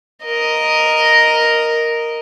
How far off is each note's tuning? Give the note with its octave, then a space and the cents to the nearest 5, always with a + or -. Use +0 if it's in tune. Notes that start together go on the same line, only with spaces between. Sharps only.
A#4 +0 D#5 +0